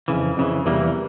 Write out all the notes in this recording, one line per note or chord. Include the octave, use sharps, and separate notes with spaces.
F2 C#3 E3
F2 C#3 E3
E2 C3 E3 G3 A#3